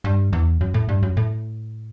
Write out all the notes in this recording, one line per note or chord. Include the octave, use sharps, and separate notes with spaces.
G2
E2
F#2
A2
G2
F#2
A2